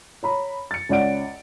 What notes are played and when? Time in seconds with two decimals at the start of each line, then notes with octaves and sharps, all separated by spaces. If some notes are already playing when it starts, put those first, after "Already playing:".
0.23 C#5 A#5 B5
0.71 A6 C#7
0.89 C#2 C#4 D5 F#5 D7